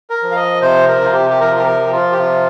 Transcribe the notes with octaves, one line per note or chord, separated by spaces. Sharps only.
A#4
F3
F5
D#5
C3 C5
A#4
C3 F4
G4
G4
F3 A#4
F4
G4
A#4
F3
G4
F4
G4
C3 F4